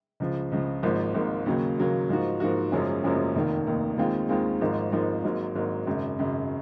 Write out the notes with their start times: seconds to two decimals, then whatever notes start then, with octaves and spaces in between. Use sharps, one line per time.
0.20 C#2 C#3 F3
0.52 C#2 C#3 F3
0.83 G#1 G#2 F3 A#3
1.14 G#1 G#2 F3 A#3
1.46 D#2 C#3 F#3 A#3
1.78 D#2 C#3 F#3 A#3
2.09 G#2 F3 A#3 D#4 F#4
2.40 G#2 F3 A#3 D#4 F#4
2.72 F#1 F#2 F3 G#3 C#4
3.04 F#1 F#2 F3 G#3 C#4
3.35 F1 D#2 D#3 A#3
3.66 F1 D#2 D#3 A#3
3.98 D#2 D#3 G#3 C4 F4
4.29 D#2 D#3 G#3 C4 F4
4.61 G#1 G#2 F3 A#3 D#4
4.92 G#1 G#2 F3 A#3 D#4
5.24 G#1 G#2 F#3 A#3
5.55 G#1 G#2 F#3 A#3
5.87 G#1 F#2 C#3
6.19 G#1 F#2 C#3